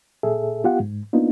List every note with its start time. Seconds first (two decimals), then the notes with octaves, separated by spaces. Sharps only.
0.23 A#2 G#4 A4 E5
0.64 B3 F4 G4 F5 F#5
0.80 G#2
1.13 A#3 B3 D4 D#4 F4